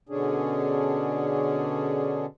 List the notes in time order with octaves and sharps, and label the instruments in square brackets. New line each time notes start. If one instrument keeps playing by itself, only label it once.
[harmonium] B2 D3 C#4 D4 G#4